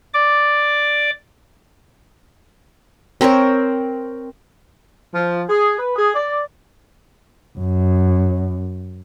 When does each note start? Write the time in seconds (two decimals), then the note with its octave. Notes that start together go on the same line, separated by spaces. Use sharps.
0.14 D5 D6
3.21 C4 A#4 C5 C#5
5.14 F3
5.48 G#4
5.78 B4
5.96 G#4
6.14 D5
7.59 F#2